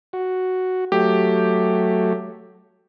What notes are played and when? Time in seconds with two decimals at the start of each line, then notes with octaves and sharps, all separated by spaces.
0.13 F#4
0.92 F#3 A3 G4